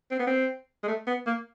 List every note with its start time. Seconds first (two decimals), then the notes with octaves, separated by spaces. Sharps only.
0.11 C4
0.20 B3
0.27 C4
0.83 G#3
0.88 A3
1.07 B3
1.27 A#3